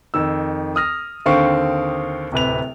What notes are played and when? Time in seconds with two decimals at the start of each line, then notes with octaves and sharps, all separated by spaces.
0.14 F2 D#3 E6
0.76 D#6 F6 A#6
1.26 D#2 D3 C4 F5 G5 C#6
2.32 D1 C3 B4 F7